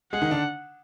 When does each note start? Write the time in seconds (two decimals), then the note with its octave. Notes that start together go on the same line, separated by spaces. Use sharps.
0.12 G#3 G#4 F#5
0.21 D#3 D#4
0.31 D3 D4